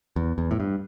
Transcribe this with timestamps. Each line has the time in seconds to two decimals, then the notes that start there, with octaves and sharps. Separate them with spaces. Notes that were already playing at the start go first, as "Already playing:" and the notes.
0.16 E2
0.38 E2
0.51 A2
0.60 G2